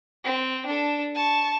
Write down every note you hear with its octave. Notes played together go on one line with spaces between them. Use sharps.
C4
D4 A4
A5 C#6